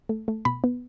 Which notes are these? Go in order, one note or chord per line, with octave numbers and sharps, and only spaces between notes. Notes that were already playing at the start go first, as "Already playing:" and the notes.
A3
A3
B2 B5
B3